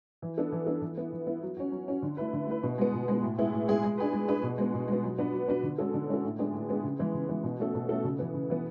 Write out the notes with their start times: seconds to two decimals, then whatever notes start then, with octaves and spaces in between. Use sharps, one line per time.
0.22 E3
0.38 B3 D4 A4
0.52 E3
0.66 B3 D4 A4
0.82 E3
0.97 B3 E4
1.12 E3
1.27 B3 E4
1.43 F#3
1.57 C#4 F#4
1.72 F#3
1.88 C#4 F#4
2.02 D3
2.17 A3 E4 B4
2.33 D3
2.47 A3 E4 B4
2.63 B2
2.78 G#3 B3
2.93 B2
3.08 G#3 B3
3.23 A2
3.38 G#3 B3 E4 G#4
3.52 A2
3.68 G#3 B3 E4 G#4
3.84 G#3
3.98 D4 G#4 B4
4.13 G#3
4.28 D4 G#4 B4
4.43 B2
4.58 G#3 B3
4.74 B2
4.88 G#3 B3
5.04 F#3
5.18 B3 D4 F#4 B4
5.33 F#3
5.48 B3 D4 F#4 B4
5.63 D3
5.78 G#3 C#4 F#4 A4
5.94 D3
6.09 G#3 C#4 F#4 A4
6.24 A2
6.38 G#3 B3 D4 G#4
6.54 A2
6.69 G#3 B3 D4 G#4
6.84 C#3
6.99 E3 G#3 B3
7.14 C#3
7.28 E3 G#3 B3
7.43 B2
7.60 A3 C#4 F#4 A4
7.74 B2
7.89 A3 C#4 F#4 A4
8.04 C#3
8.19 E3 B3
8.34 C#3
8.50 E3 B3